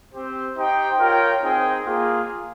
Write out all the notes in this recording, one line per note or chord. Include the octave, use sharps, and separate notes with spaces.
C4 G4 C5
D#4 G4 C5 G5
F4 A#4 C#5 G5
C4 D#4 G#4 C5 G5
A#3 F4 G#4